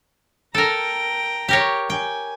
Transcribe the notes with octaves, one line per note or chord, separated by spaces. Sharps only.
A4 A#4 G5 A#5
G4 A#4 C#5
G5 G#5